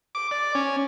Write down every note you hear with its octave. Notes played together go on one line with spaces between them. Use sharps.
D6
D5
C#4